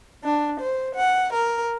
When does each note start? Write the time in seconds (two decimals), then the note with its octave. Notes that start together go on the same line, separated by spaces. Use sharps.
0.24 D4
0.61 C5
0.96 F#5
1.33 A#4